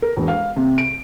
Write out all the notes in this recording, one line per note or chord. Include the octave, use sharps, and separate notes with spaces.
A#4
E1
F5
C3
D7